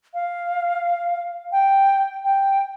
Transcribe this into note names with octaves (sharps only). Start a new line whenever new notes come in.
F5
G5
G5